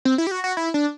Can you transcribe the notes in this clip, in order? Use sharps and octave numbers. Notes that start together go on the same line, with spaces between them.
C4
E4
G4
F#4
F#4
E4
D4